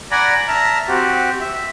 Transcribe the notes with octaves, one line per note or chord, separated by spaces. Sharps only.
D5 F#5 G#5 A#5 B5
E5 A5 A#5 F6
C4 F#4 G4
E5